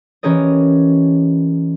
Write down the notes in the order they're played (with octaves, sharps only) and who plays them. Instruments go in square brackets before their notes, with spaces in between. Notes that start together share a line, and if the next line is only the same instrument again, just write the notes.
[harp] E3 C#4 G4 A#4 D#5